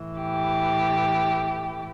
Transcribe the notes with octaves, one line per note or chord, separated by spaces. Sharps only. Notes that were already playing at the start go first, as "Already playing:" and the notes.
Already playing: A2 E3
G4